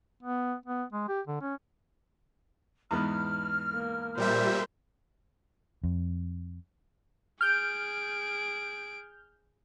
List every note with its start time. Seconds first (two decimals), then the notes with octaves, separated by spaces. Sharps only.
0.23 B3
0.66 B3
0.92 G#3
1.08 G4
1.27 D3
1.41 C#4
2.91 E2 G#2 B3 F6
3.73 A#3
4.17 A#2 G3 A#4 C5 E5
5.84 F2
7.41 G#4 F6 G6 D7